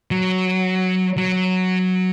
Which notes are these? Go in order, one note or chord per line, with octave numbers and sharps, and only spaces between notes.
F#3
F#3